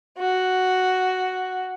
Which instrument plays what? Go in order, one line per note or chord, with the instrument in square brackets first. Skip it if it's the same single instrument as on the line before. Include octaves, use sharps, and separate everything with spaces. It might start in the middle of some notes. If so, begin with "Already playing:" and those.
[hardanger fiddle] F#4